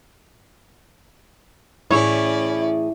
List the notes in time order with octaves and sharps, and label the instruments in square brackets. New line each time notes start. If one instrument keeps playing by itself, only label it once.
[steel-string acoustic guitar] A2 E3 G#4 [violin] C#4 D5 [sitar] E4 [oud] C#5